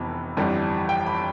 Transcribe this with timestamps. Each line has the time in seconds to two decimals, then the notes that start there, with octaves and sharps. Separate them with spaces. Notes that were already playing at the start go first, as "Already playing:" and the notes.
Already playing: F1 F2 E3 B3 B5
0.37 G1 F2 E3 G3
0.89 G5
1.06 B5